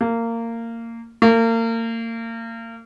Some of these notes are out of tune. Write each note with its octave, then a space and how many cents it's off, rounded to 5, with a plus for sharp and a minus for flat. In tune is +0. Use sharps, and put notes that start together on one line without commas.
A#3 -20
A#3 -35